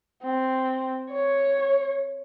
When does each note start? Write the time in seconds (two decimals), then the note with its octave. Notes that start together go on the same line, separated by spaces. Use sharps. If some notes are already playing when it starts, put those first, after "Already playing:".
0.24 C4
1.12 C#5